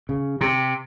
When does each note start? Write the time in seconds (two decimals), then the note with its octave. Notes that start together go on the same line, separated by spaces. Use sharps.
0.09 C#3
0.41 C3